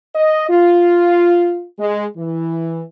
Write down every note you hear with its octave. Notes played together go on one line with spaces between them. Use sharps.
D#5
F4
G#3
E3